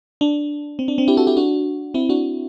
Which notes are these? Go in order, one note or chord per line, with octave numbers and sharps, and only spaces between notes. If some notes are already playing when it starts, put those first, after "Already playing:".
D4
C4
D4
C4
E4 G4
F#4 A4
E4 G4
D4 F#4
C4 E4
D4 F#4